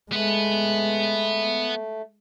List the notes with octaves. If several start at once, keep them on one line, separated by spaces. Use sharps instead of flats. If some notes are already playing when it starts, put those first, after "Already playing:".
G#3 A3 B3 B4